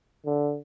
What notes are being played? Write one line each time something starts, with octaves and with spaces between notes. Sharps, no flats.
D3